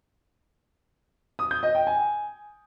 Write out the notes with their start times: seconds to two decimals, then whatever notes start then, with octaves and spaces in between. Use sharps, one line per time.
1.39 D#6
1.51 G6
1.63 D#5
1.75 G5
1.87 G#5